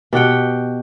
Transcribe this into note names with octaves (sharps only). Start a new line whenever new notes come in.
B2 G4 F#5 G5